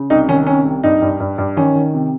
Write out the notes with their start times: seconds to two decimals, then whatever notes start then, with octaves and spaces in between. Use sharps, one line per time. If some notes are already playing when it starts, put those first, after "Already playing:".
Already playing: C#3
0.10 C2 D#4
0.28 D#3 C#4
0.46 C3 C#4
0.65 C2
0.84 G2 D#4
1.02 G2
1.20 G2
1.38 G2
1.57 D#3 C#4
1.75 D#3
1.94 C3